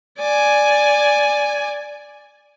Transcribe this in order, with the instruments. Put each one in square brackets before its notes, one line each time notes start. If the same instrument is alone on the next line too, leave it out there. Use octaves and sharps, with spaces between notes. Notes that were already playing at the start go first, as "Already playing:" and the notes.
[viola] D5 G#5